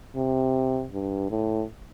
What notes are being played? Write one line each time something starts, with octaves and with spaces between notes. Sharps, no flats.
C3
G2
A2